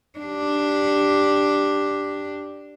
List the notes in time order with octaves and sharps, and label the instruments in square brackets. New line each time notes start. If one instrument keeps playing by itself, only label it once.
[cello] D4 G4